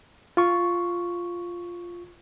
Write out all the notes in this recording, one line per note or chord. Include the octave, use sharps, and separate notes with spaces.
F4 C#6